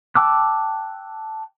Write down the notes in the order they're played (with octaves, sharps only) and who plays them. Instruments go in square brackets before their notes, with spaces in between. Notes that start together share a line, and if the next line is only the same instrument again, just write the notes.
[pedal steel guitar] G5 A5 D6 E6 F#6